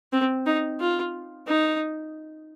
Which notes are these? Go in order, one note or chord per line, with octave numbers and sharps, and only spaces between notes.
C4
D#4
F4
D#4